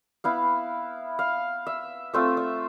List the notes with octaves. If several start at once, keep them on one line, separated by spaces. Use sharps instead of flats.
B3 E4 F5
F5
E5
A3 C4 F4 E5
E5